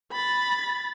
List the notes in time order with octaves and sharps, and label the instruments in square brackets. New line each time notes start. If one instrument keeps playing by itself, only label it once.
[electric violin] B5 A6